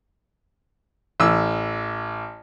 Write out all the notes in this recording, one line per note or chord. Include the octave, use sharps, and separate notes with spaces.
A1 E6